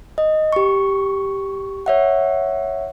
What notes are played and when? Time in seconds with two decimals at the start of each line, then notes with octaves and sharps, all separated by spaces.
0.18 D#5
0.53 G4 C#6
1.86 C#5 E5 F#5